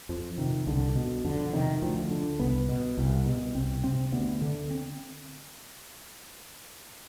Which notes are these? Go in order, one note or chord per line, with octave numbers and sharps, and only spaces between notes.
F2 F3
C3 D#3
C2 D3
B2
F2 D3
C3 D#3
D2 F3
D3
C2 B3
B2
C2
B2
C2 C4
C3 C4
D2 B3
D3
C4